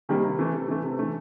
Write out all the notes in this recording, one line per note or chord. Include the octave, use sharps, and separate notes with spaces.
C3 D#3 G3 A#3
C3
E3 A3
C3
E3 A3
C3
E3 A3